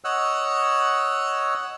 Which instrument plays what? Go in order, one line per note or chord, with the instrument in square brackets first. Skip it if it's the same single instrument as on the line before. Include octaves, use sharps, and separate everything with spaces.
[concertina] C#5 D#5 F#5 E6 F#6